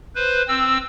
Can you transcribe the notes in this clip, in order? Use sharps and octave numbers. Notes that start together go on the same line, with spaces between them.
B4 C5
C4 E6